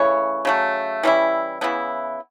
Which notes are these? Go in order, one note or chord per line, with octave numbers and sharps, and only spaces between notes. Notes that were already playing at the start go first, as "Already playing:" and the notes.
Already playing: C#3 E3 A3 C#4 C#5
C#3 F#3 A3
E3 G3 C#4 E4
C#3 E3 B3 E4